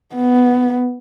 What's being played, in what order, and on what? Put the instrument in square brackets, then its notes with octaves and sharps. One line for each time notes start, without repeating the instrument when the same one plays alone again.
[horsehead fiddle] B3